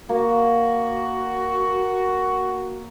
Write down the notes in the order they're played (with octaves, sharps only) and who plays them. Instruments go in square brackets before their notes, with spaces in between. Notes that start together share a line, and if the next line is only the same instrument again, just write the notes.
[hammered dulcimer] A#3 [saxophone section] F#4